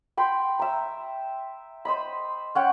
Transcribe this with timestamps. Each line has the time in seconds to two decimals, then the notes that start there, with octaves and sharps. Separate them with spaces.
0.17 G5 B5 C6
0.59 E5 A#5
1.85 C5 D#5 B5
2.55 C#4 F#5 G5